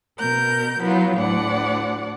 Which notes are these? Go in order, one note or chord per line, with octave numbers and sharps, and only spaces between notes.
B2 A#4 G6
F#3 B3 E4 F4
D2 A2 D5 F#5